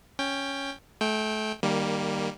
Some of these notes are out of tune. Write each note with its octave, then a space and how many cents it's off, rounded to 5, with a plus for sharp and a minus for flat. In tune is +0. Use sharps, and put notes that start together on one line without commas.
C#4 +0 G5 +15
A3 -30 G5 +0
D#3 -25 G3 +0 A#3 +0